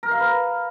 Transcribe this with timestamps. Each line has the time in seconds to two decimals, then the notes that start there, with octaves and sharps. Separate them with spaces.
0.03 A#4
0.11 F5
0.20 B4